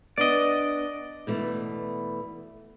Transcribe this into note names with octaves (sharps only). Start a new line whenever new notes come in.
B3 D4 D5 D#5
B2 E3 A3